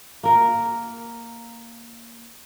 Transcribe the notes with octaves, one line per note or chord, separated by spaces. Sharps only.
A#3 A#4